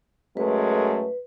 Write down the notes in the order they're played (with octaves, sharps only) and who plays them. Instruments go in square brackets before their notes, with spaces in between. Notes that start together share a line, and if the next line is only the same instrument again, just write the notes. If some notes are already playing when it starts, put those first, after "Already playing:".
[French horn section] F#2 G#3 A3 [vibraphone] B4